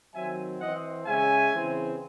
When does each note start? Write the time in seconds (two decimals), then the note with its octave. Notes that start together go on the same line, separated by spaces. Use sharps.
0.15 D#3 F#3 C4 E5 G#5
0.61 E3 C4 D#5 F#5
1.06 C#3 G#3 C#4 E5 G#5
1.52 C#3 E3 C4